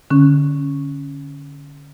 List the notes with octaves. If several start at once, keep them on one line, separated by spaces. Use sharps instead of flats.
D3 C#4